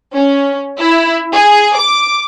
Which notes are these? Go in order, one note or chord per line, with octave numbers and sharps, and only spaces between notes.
C#4
E4
G#4
D6